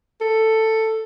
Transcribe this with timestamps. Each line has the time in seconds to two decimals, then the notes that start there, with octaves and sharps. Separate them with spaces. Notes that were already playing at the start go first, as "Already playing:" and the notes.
0.21 A4